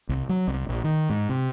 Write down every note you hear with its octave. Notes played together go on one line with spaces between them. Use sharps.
C2
F#3
C2
A#1
D#3
G#2
C3